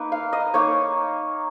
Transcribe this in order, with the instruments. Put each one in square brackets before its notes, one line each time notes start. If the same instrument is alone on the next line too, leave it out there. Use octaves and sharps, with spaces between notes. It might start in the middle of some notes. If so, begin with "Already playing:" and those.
Already playing: [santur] A#3 D#4 B4
F5
D#5
A#3 D#4 C#5